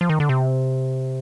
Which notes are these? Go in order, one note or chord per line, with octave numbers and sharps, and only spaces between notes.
F3
D#3
D3
C3